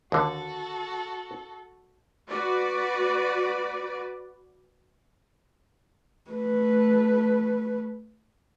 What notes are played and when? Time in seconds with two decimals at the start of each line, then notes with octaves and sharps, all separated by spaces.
0.12 D#2 D3 F#4 A4
2.29 F#4 B4 D5
6.31 A3 B4